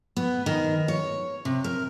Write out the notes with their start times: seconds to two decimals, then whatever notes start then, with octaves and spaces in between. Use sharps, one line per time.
0.17 B3
0.46 D#3
0.88 C#5
1.45 C3
1.64 A#4